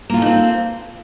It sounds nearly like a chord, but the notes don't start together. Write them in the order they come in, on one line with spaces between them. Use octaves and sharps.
A#3 F4 A4 D#4 C4